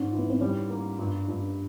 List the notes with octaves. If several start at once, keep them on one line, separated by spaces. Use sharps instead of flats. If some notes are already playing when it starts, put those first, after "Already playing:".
Already playing: G#2 C#4 D4
E3
B3
C4
G3 C#4
A#3
G2
G2